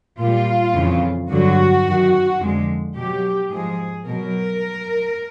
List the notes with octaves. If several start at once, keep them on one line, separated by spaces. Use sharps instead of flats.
A#2 G3 F4
F2 C#3 E3
G2 D3 F#3 F#4
F#2 D#3 F#3
F2 D3 F3 G#3
B2 F#3 G4
G#2 F3 G#3 G#4
B2 F#3 A#4